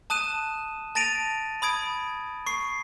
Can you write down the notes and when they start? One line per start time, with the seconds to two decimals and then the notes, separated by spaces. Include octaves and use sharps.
0.10 A5 D#6 F#6 D#7 E7
0.95 A5 A6 A#6 D7 D#7 F7
1.62 B5 D#6 G#6 D7
2.46 C#6 C7